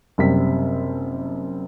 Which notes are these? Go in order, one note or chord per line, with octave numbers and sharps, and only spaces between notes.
F#1 C3 G3 B6